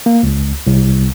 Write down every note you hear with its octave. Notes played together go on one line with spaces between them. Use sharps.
A#3
C#2
C2